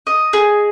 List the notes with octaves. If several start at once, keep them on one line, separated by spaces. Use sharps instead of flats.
D#5
G#4